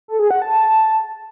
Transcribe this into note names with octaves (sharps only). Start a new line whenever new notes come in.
A4
G#4
F#5
A5